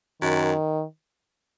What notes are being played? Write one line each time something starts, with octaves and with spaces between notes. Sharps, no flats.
F#2 D#3